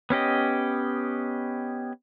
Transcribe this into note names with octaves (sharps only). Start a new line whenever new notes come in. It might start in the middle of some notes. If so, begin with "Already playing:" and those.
B3 C#4 G4 D#5